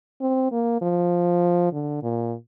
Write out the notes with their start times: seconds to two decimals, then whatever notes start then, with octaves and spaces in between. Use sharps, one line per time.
0.21 C4
0.52 A#3
0.82 F3
1.73 D3
2.03 A#2